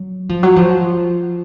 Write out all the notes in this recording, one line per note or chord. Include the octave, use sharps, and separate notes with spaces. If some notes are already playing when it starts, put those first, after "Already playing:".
Already playing: F#3
F3
F#3
F3